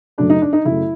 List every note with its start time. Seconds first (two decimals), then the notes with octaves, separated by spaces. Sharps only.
0.18 F#2 C#3 F#3 A3 D4
0.30 D#4
0.42 D4
0.53 D#4
0.65 F#2 C#3 F#3 A3 E4